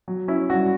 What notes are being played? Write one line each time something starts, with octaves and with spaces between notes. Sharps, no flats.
F#3
C#4 E4
G2 F#4